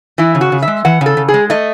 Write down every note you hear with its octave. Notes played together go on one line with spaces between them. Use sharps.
E3 E4
C#3
F#4
C#3
E5
G#3
E3 F#5
C#3 A4
C#3
G#4
G#3
A3 D#5